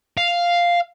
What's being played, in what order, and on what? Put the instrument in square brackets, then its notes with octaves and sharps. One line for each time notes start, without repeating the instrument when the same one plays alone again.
[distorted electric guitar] F5